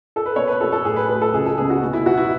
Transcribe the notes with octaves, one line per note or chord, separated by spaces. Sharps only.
A4
B4
B2 C#5
B4
F#3 B3 A4
A4
A2 G#4
B4
F#3 A3 B4
A4
C#2 G#4
A4
C#3 G#3 B3 G#4
F#4
B2
E4
F#3 B3 F#4
E4